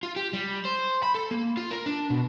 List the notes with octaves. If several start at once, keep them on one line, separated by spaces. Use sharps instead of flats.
F4
G4
G3
C5
B5
A4
A#3
F4
A#4
D4
B2